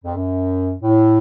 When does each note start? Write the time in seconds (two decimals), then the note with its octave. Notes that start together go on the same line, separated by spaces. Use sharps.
0.04 F2
0.15 F#2
0.82 A2